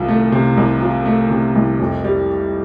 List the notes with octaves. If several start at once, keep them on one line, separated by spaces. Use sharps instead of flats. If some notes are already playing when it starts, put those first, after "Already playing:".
Already playing: C2 C3 F4
A3
C3
C2
F4
A3
C3
C2
F2
G3